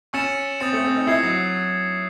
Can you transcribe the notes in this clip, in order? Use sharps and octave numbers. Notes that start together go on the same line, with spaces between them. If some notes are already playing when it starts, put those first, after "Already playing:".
C#4 C#6 E6 A6 C#7 E7
C4 D#6 A6 C#7
A3
C4
D#4
E4 E6 G#6 C7
F#3